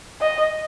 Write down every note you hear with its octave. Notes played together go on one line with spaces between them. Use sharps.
D#5